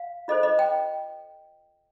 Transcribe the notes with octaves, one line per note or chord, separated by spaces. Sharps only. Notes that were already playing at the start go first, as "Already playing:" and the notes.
Already playing: F5
F4 A4 C5 D#5
D#5
G5